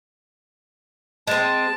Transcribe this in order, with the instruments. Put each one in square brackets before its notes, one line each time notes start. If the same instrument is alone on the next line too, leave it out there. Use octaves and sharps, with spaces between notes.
[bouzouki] G#3 C4 [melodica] A5